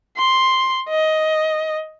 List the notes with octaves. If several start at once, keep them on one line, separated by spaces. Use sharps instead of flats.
C6
D#5